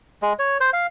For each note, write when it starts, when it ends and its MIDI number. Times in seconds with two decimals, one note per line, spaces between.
0.22 0.33 56
0.39 0.58 73
0.60 0.70 72
0.73 0.87 77